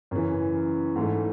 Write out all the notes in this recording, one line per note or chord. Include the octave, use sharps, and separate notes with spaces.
F#2 C#3 E3
G#2 E3 A3